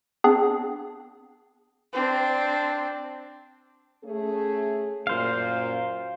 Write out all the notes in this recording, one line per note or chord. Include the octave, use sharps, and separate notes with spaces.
B3 C4 D4 G#4
C4 D4
A3 C#4 G#4
F#2 A#2 C5 F5